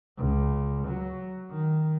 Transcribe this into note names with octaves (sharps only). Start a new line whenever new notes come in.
C#2
F#3
D#3